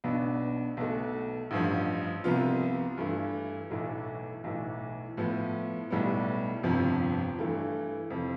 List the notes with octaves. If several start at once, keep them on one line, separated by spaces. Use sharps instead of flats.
B1 B2 B3 D4
B1 B2 A3
A1 G2 F3
C2 C3 F3 B3 F4
G2 E3 A3 E4
B1 A2 E3 A3 E4
B1 A2 E3
A2 F3 B3
B1 A2 G3 B3
G1 F2 C3 F3
G2 E3 A3 E4
F2 C3 F3